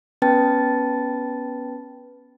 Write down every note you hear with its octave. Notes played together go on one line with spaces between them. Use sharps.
B3 C#4 B4 G5 A5 A6